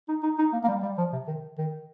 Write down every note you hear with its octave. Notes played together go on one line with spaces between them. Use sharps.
D#4
D#4
D#4
A#3
A#3
G3
G3
F3
C3
D#3
D#3